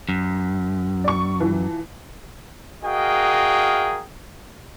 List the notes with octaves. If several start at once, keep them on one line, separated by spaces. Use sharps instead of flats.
F#2
D5 C#6
E3 F3
F#4 G#4 A#4 D#5 F5 G5